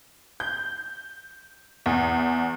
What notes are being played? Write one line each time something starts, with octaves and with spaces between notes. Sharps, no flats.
G6
E2